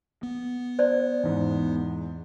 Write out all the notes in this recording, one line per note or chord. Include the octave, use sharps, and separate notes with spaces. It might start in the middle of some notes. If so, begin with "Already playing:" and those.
B3
C5 D5
E2 G#2